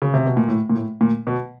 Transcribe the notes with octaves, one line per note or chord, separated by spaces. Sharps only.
C#3
C3
B2
A#2
A2
A#2
A2
A#2
B2